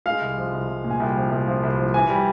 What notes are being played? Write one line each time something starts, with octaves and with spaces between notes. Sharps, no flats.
G#3 F5
C2
F3
C2
C2
A#2
G#5
C2 G5
F3
C2
F3
C2
F3
E3 G#5
G3